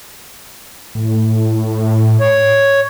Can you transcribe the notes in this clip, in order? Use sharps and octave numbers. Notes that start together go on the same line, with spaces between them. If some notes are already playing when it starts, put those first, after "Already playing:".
A2
C#5